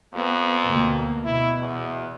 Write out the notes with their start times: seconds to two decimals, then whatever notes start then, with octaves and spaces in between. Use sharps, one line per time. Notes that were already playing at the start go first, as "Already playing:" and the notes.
0.14 F2 B3
0.66 D2 B2 A#3
1.25 B2 E4
1.60 E2